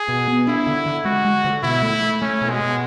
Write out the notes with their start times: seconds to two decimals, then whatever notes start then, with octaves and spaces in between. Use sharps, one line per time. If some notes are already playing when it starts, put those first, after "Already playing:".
Already playing: G#4
0.08 B2
0.28 B3
0.47 D4 E4
0.67 D3
0.86 D3
1.05 G#3 F#4
1.25 G#3
1.44 D3
1.63 B2 E4
1.82 A3
2.02 A3
2.22 A3 C#4
2.41 B2
2.50 G#3
2.61 B2